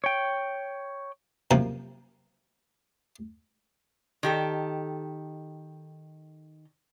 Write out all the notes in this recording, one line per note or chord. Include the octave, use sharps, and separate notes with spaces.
C#5 G5
F#2 C3 F3 A#3
D#3 G4 A4